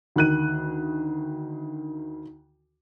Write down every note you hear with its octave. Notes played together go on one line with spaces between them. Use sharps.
D2 D#3 F#6 D#7